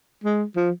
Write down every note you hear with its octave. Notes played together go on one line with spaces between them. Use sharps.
G#3
F3